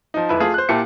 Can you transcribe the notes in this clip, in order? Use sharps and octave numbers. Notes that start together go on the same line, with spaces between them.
F3 D#4
F1 E4 B4
A3 F4 G#4
C5 F#6
A#2 E4 G4 A5 C#7